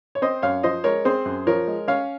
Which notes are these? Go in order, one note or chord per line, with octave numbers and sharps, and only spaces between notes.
C#5
C4 C5 D#5
F#2 C#5 F5
F3 C5 D#5
G#3 A#4 C#5
C4 G#4 C5
F#2
F3 A#4 C#5
G#3
C#4 C#5 F5